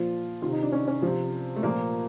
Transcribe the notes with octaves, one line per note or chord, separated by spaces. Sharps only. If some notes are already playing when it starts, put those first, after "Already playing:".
Already playing: A#2 F3 F4
C3 D#3 F4
D#4
D4
C#4
C#4
C3 F3
A3
A#2 F3 A#3